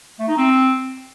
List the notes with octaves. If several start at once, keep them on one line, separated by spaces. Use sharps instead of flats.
A3
D#4
C4